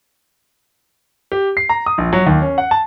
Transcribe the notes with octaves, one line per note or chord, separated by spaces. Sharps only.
G4
C7
A#5
D#6
A#1
F#3
D#2
C#4
F#5
A5